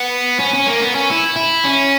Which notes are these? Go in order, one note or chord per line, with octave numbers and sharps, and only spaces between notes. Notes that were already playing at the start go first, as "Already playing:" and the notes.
Already playing: B3
C#4
C#4
A#3
B3
C#4
E4
E4
C#4